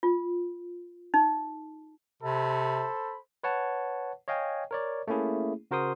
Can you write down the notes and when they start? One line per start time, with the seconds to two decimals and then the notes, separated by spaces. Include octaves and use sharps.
0.03 F4
1.14 D#4
2.22 C3 A4 C5 B5
3.44 B4 C#5 F#5 A5
4.28 C#5 D#5 F5 G5 G#5
4.71 A#4 C#5 D5
5.08 A3 A#3 C#4 E4 G#4
5.71 C#3 F#4 A#4 C5 C6 D#6